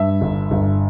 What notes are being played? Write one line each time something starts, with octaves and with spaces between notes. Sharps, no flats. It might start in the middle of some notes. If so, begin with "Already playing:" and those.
Already playing: G2 E5
G1
G1